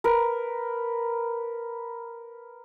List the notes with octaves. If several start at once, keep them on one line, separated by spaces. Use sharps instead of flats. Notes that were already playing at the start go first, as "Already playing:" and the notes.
A#4 B4